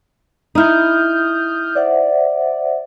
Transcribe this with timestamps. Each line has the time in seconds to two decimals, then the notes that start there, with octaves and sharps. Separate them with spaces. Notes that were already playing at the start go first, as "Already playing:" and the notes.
0.55 D#4 E4 D#6 F6 G6
1.75 C5 D5 E5 F#5